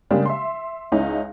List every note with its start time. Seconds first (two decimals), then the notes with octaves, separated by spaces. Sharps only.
0.11 C#3 G3 G#3 A#3 D4 G4
0.26 E5 C6
0.92 C#2 C#4 D#4 E4